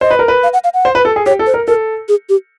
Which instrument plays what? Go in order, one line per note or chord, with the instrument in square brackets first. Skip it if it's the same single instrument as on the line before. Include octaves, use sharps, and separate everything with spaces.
[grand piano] C5 [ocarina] D#5
[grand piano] B4
A#4
B4
[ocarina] F5
F#5
F5
F#5
[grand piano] C5
B4
A4
G#4
[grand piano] G4 [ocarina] C#5
[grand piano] A4
[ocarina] C5
[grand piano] A#4
[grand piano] A4 [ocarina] A#4
[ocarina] G#4
G4